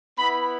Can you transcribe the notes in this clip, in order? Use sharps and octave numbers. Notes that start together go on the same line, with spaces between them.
B3 E4 B5